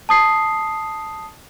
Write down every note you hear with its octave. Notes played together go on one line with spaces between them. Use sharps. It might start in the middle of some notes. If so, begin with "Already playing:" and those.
A5 D#6 C7